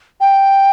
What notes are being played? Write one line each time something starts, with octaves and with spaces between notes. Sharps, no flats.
G5